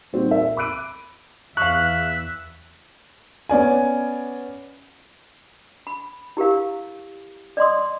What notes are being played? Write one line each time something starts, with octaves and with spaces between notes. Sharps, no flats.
A#2 G3 C4 D#4 F#4
A#4 E5
B5 D6 E6 F#6 D7 D#7
E2 E5 F5 C#6 F#6
B3 C#4 D5 G#5
B5
E4 G4 A#4 F5
D5 D#5 C6 D#6